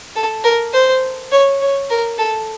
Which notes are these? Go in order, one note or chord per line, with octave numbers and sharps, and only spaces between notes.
A4
A#4
C5
C#5
C#5
A#4
A4